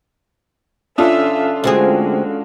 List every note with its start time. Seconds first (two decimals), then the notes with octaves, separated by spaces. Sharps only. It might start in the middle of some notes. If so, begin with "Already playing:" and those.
0.98 C#4 D4 F4 A4 E5 D#6
1.64 D2 G#3 C4 F#4 G#4